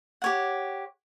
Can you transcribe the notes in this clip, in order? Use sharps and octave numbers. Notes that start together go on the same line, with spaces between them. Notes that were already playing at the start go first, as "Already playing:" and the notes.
G4 C#5 F#5